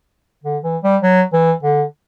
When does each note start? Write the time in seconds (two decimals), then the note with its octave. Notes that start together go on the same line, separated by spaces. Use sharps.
0.44 D3
0.64 E3
0.83 G3
1.02 F#3
1.33 E3
1.63 D3